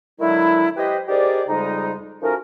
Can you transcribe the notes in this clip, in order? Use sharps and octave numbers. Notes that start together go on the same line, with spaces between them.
D3 D#3 F#3 G#3 E4
G4 B4 C5 D#5
D#4 G4 G#4 A#4 C5 D5
F2 G#2 C#3 G3 G#3 D#4
F3 A3 C#4 D#4 F#4 A#4